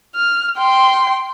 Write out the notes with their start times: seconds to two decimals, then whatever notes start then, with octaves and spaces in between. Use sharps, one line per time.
0.16 F6
0.58 G5 C6